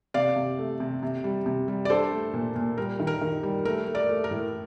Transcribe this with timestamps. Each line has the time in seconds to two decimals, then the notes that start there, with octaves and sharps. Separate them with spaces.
0.14 C3 D5 F5
0.36 C3
0.59 A3
0.80 C3
1.03 C3
1.24 G3
1.46 C3
1.68 G3
1.85 D5
1.90 D4 A4 C5
2.12 A3
2.34 A#2
2.56 A#2
2.78 G3 A#4
3.00 D#3
3.07 A#4
3.22 D#3
3.43 G3
3.65 A3 A#4
3.87 A3
3.95 A#4 D5
4.09 A3
4.24 A#4
4.31 A2